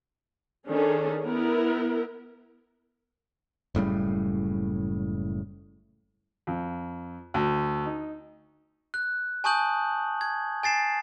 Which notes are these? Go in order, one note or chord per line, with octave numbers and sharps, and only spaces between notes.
D#3 C#4 D4 G#4 A4
B3 E4 A#4
F#1 A2 C#3 G3
F2
D2
D#4
F#6
G#5 A5 C#6 D#6 G6 F#7
G#6
G#5 A6 C7 E7